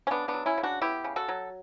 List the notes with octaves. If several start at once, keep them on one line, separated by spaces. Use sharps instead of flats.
C#4
C#3 B3 D4
B3 D4
F#3
C#4 E4
C#3
D4 F#4
B3 E4 G4
C#3
F#4 A4
F#3